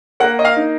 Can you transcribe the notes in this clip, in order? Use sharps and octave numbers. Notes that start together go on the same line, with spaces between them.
A#3 F#5
D#5
F5
D#4